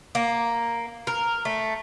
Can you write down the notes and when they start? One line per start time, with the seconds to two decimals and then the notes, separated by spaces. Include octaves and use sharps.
0.15 A#3
1.07 A#4
1.45 A3